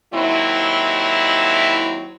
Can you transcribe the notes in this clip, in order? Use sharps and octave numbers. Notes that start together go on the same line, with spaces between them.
D#2 F#3 C4 E4